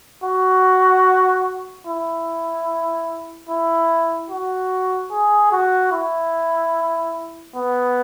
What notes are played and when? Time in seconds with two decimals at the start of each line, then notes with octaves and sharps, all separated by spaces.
0.24 F#4
1.87 E4
3.50 E4
4.30 F#4
5.11 G#4
5.52 F#4
5.92 E4
7.56 B3